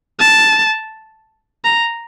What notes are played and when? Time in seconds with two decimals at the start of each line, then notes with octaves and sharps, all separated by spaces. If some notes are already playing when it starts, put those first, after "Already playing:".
0.19 A5
1.65 A#5